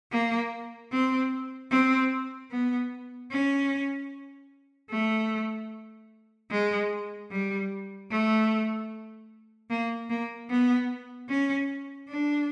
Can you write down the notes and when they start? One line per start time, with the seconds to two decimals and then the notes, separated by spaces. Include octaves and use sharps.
0.12 A#3
0.92 C4
1.71 C4
2.52 B3
3.31 C#4
4.91 A3
6.51 G#3
7.31 G3
8.11 A3
9.70 A#3
10.10 A#3
10.50 B3
11.29 C#4
12.09 D4